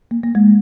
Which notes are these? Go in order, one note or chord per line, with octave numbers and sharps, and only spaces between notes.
A#3
A#3
G#3